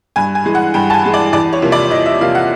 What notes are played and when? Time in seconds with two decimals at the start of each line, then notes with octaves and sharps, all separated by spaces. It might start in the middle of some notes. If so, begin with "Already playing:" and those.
0.16 G2 G#5
0.35 G#5
0.45 E3 G#3
0.55 F#5
0.74 G2 G5
0.90 A5
0.94 G#5
1.04 E3 G#3
1.14 D5
1.33 E2 D5
1.53 C#5
1.62 C3 F3 A#3
1.72 D5
1.91 E2 D#5
2.06 E5
2.21 C3 F3 A#3 F5
2.35 F#5